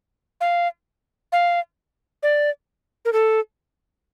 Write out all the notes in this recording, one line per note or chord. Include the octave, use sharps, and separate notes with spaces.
F5
F5
D5
A#4
A4